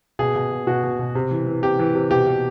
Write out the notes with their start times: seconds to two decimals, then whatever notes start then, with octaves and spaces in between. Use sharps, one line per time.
0.19 B2 G#4
0.36 B2
0.51 B2
0.67 B2 F#4
0.83 B2
0.99 B2
1.15 C3
1.31 E3
1.47 E3
1.62 C3 G4
1.79 E3
1.95 C3
2.11 B2 G4
2.27 B2